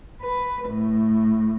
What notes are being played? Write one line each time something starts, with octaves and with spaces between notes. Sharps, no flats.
B4
A2